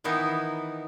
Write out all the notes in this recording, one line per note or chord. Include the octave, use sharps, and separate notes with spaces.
D#3 E3 B3 D#4 E4